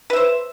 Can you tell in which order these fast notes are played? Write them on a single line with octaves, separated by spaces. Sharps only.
B4 E5 C5